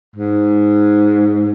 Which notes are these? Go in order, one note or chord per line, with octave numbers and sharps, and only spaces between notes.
G#2